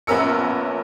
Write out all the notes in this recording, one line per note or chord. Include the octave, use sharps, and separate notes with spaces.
A#1 B3 C#4 A#4 E6 C#7